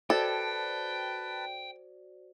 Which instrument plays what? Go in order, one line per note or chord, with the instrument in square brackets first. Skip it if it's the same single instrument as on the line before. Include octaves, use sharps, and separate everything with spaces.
[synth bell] F#4 C5 D5 [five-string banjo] A4 [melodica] B4 A5 [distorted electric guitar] G5